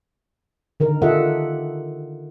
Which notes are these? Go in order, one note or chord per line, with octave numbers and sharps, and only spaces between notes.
D3 D#3 A#4
F4 G4 A4 D#5 E5 F#5